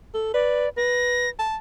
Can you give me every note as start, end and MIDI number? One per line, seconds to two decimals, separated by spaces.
0.14 0.32 69
0.34 0.66 71
0.34 0.69 74
0.77 1.28 71
0.77 1.29 94
1.39 1.57 81